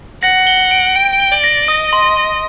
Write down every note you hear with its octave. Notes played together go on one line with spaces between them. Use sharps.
F#5 A#6
G7
D7
G5 D7
G7
D5
A#6
D#5 D#6
C6
C6